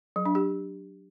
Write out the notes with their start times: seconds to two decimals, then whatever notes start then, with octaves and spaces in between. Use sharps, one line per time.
0.16 F#3
0.26 D4
0.35 G4